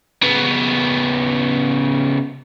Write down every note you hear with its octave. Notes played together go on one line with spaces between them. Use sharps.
C#3 B3